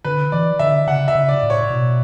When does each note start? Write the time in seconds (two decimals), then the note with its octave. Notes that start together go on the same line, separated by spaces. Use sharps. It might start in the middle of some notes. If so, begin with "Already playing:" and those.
0.05 D3 B4
0.32 E3 D5
0.59 D3 E5
0.87 C#3 F#5
1.08 E5
1.15 C#3
1.29 D5
1.43 A2
1.50 C#5
1.70 B2